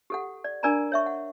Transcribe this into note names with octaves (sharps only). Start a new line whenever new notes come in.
G4 A4 F#5
D5
D4 A#4 D5 G#5 A#5 B5
C#5 E5 C#6
F#5